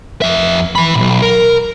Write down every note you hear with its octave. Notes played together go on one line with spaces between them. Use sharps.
F2 E5
E3 B5
B1 A#2
A#4